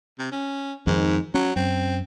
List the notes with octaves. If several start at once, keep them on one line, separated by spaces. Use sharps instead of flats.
C3
C#4
F2 G#2 D#3
F#3 C#4
F#2 C4